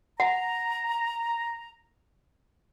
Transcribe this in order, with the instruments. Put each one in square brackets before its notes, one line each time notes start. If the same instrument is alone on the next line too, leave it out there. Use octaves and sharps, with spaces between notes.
[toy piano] F#5 [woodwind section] A#5